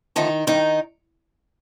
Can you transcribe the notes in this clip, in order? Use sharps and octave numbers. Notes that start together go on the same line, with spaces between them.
D3 D#3 F3 A3 D#4
G2 D#3 D#4